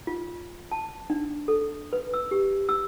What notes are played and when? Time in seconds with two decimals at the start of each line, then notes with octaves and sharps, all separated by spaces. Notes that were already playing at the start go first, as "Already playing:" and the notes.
0.07 F4
0.72 A5
1.10 D4
1.48 A4
1.93 B4
2.14 E6
2.31 G4
2.69 E6